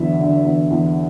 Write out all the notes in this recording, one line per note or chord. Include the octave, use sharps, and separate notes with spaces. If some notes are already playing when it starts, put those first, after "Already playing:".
Already playing: E2 D3 F#3 E5
D3
E2
E2